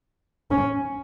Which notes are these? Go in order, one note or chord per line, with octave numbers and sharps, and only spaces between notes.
C#4